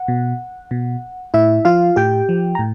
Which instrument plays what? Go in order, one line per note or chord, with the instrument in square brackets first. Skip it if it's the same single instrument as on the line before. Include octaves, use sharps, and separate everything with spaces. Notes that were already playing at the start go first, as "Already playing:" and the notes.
Already playing: [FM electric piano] F#5
B2
B2
A2 E4 E5
F3 F4 F5
A2 G4 G5
F3
A#5
A2